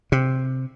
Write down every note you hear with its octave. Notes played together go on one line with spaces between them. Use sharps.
C3